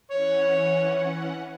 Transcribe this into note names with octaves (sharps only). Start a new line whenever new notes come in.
E3 C#4 C#5 F#5